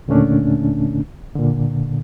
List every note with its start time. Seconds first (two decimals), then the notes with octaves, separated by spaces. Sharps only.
0.08 D#2 A#2 D3 A3 C#4 D4
1.35 A#2 D3